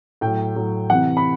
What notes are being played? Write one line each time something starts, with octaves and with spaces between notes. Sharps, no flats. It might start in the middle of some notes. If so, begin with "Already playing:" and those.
A2 F#3 G5
A2 F#3
C3 E3 F#5
B5